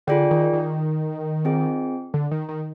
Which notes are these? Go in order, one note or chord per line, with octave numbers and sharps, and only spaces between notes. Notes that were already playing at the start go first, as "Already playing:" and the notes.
D3 F4 G#4 D5 G5
D#3
D#3
C4 F4 G#4 D#5 G5
D3
D#3
D#3